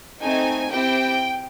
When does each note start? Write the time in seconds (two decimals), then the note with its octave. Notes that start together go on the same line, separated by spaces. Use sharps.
0.21 A3 C4 D#4 G#5
0.72 C4 E4 G4 G5